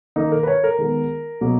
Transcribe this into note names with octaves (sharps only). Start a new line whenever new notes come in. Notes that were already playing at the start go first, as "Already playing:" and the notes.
D#3 A#3 D#4
A#4
B4
C#5
A#4
D#3 G#3 B3
B2 F#3 A#3